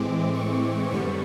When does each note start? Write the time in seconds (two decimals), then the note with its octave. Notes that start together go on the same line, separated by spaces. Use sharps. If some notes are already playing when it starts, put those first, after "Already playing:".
Already playing: A2 E3 G#3 C4 D6
0.34 C#6
0.91 F#2 D3 G3 B3 C#6